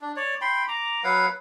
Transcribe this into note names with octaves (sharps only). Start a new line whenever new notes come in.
D4
C#5 D5
G5 B5 C6
A#5 D6
F#3 B4 F5 F#5